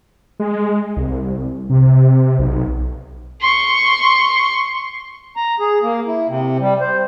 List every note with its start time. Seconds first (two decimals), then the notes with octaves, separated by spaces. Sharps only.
0.40 G#3
0.97 C2
1.70 C3
2.39 B1
3.40 C6 C#6
5.37 A#5
5.60 G#4
5.82 A#3
6.07 E4
6.29 C3
6.60 G3
6.81 C5